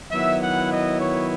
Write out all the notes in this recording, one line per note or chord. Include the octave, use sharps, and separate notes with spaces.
D#3 F#3 B3 E4 E5
F#5
D#5
C#5